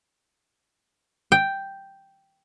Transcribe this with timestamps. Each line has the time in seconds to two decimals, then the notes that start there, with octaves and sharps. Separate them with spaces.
1.32 G5